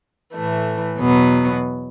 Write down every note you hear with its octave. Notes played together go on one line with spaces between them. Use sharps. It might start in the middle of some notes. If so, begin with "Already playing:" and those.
A2 E3 A3
E2 B2 F#3 B3